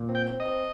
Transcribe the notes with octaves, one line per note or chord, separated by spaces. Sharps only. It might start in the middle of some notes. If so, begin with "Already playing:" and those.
Already playing: A#2
C4
G5
C4
D#5
C4